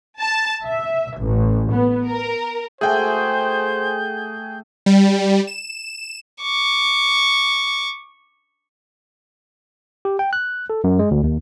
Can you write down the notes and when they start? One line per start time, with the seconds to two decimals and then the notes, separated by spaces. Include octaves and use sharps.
0.20 A5
0.64 E5
1.19 A1
1.72 B3
2.07 A#4
2.81 A3 F#4 G#4 C5 G5 G#5 G6
4.86 G3
5.47 E7
6.42 C#6 D6
10.05 G4
10.19 G5
10.33 F#6
10.70 A4
10.84 F#2
10.99 G#3
11.11 D2
11.24 D#2